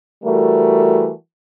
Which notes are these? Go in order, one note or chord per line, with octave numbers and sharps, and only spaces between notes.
E3 G3 A3 F#4 A#4